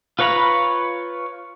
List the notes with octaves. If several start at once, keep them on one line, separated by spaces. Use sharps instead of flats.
F4 B4 C#5 A#5 B5